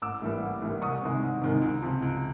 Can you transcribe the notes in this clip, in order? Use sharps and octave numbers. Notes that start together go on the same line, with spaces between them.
A1 D6 E6
A2 E3 G3 A#3
A1
A2 E3 G3 A#3
C2 C#6 D#6
C3 D#3 G#3
C2
C3 D#3 G#3
C#2
C3 F3
C#2